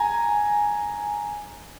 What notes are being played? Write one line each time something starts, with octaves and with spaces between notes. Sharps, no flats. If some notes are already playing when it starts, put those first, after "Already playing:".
Already playing: G#5 A#5